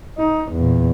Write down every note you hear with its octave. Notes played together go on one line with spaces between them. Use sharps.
D#4
E2 A#2